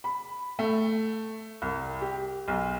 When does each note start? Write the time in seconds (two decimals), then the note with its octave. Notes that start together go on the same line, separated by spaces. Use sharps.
0.04 B5
0.59 A3
1.62 C2
2.01 G4
2.48 B1